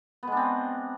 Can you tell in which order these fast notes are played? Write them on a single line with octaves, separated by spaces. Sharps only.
B3 G#3 D4 C4